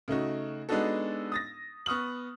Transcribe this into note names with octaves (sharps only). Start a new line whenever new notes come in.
C#3 A3 D#4 F#4
G#3 B3 D4 D#4 F#4 A4
D#6 A6 A#6
B3 C#6 D#6 F6 F#7